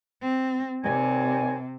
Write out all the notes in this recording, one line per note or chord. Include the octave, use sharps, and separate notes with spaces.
C4
D#2 C3 G3 G#5